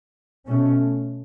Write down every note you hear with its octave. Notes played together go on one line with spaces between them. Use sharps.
B2 A3 C#4